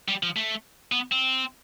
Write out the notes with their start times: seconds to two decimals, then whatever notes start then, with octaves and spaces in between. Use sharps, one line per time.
0.08 G3
0.23 F3
0.36 A3
0.92 B3
1.12 C4